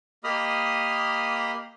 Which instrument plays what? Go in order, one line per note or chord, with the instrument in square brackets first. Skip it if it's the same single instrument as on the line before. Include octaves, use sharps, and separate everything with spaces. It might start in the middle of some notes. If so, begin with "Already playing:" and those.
[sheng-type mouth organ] A#3 G4 D#5 B5 D#6 F6